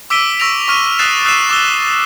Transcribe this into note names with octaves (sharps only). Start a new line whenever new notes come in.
D6 E6 B6 D7 D#7 G7
C#6 E6 A#6 D7 F7
C#6 F6 D#7
D#6 F6 F#6 A6 C7 E7
D#6 E6 F#6 C7 D#7 E7
C#6 D6 E6 G7